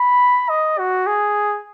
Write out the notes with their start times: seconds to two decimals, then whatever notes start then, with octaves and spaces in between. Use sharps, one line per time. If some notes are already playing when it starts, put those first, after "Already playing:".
Already playing: B5
0.49 D#5
0.79 F#4
1.07 G#4